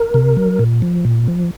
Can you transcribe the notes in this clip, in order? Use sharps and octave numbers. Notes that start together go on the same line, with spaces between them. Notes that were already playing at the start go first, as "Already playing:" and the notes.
Already playing: A#4
C3
F#3
A#2
F3
A#2
F3